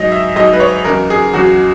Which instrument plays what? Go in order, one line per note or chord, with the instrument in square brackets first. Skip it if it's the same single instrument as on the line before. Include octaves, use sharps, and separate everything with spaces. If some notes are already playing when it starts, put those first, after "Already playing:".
Already playing: [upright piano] G#2 F#3 D#5
E5
G#2 F#3 D#5
B4
C#5
E2 C#3 F#3 A#4
G#4
E2 C#3 F#3 F#4